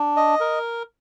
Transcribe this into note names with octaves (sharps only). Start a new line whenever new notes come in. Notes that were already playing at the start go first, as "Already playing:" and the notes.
Already playing: D4
D#5
A#4